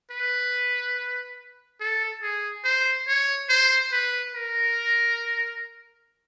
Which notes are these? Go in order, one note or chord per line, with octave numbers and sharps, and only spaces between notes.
B4
A4
G#4
C5
C#5
C5
B4
A#4